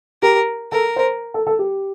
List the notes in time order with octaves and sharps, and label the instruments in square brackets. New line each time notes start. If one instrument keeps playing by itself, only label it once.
[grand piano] G4 [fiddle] A#4
[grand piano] A4 [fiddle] A#4
[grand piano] C5
A4
A4
G4